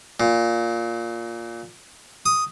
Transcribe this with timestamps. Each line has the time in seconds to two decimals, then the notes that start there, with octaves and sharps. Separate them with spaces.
0.20 A#2
2.26 D#6